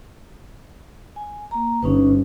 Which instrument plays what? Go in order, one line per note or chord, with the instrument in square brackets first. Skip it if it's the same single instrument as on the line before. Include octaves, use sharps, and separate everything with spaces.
[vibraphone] G#5
A#3 A#5
[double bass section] G1 [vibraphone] C#4 D#4 B4